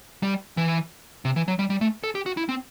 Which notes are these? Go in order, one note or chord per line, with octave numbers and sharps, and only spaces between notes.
G3
E3
C3
E3
F#3
G3
G3
A3
A4
G4
F#4
E4
C4